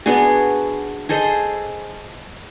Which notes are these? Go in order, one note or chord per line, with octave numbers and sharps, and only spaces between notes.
B3 D4 F#4 G#4
G#4 A4 C5 D#5